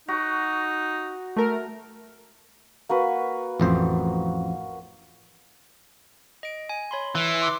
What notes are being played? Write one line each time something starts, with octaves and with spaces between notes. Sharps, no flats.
D#4 F#4
A3 A#4
A#3 F#4 B4
A1 F2 C5
D#5 D7
G#5
C#5 B5 C6
E3
C6 D6